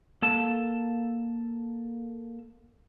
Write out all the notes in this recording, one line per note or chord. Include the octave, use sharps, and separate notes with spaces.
A#3 A4 A5